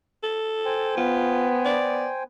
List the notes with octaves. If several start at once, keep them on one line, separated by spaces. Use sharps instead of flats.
A4
C5 G5 G#5
B3 F4
D5